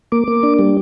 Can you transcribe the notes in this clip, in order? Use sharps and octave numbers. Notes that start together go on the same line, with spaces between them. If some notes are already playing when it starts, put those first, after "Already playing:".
A#3 D6
A#3
D4
G3